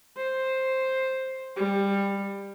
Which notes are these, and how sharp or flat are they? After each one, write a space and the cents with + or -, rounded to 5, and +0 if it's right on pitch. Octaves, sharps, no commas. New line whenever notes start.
C5 +5
G3 +20